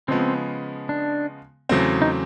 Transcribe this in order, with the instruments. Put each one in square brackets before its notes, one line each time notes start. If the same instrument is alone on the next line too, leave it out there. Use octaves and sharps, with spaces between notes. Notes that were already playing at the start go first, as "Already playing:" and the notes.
[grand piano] C#3 F3 G#3 B3 [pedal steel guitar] C4
[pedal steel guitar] D4
[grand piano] E2 C#3 F#3 A3 C4
[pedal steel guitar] D#4